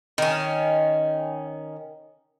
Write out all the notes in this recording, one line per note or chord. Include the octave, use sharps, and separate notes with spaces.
D#3 C#4